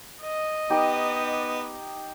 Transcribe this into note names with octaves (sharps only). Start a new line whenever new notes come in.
D#5
B3 D#4 G4